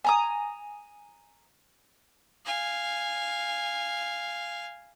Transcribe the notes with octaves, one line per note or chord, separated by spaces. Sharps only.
G#5 A#5 D#6
F5 G#5